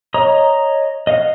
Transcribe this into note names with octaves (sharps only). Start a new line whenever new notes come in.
C#5 D#5 A#5 D#6
D#5 F5 F#5